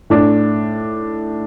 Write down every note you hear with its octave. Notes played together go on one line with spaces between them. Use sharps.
A2 D4